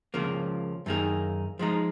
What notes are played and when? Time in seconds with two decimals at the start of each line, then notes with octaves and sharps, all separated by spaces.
0.14 C#2 C#3 F3 A#3
0.86 F#2 D#3 A#3 D#4 G#4
1.59 F3 G#3 D#4